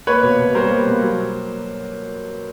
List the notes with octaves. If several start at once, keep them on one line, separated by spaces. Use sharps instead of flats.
A#3 B4 C#5
B2
B2
G3 A#4 C5
A#3
B2
F#3